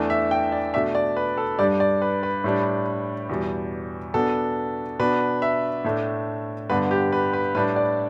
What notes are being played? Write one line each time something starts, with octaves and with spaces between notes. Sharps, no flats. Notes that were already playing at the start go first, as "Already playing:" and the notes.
Already playing: E2 E3 A3 D4
E5
G5
D5
B2 A3 D4 E5
D5
B4
A4
G2 G3 D4 D5
D5
B4
B4
A2 G3 D4
E2 B2 G3
B2 B3 D4 A4
B2 B3 D4 B4
E5
A2 A3 D4
G2 D3 B3 D4 B4
G4
B4
B4
A2 G3 D4 B4
D5